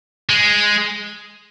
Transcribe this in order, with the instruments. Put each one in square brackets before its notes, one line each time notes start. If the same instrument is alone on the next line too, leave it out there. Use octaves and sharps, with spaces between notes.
[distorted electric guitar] G#3